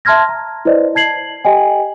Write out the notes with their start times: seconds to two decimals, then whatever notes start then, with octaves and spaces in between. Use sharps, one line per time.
0.05 E5 A5 C6 F6 G#6 A#6
0.29 A#5
0.65 E4 B4 C5 D5 D#5
0.95 A5 G#6 C7 F#7
1.45 G4 A4 D#5 G5 G#5